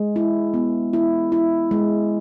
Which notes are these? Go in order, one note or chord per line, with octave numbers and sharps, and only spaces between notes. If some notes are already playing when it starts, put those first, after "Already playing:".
Already playing: G#3
E4
B3
E4
E4
G#3